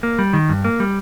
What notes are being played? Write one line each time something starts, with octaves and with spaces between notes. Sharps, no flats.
A#3
G3
D#3
G2
A#3
G3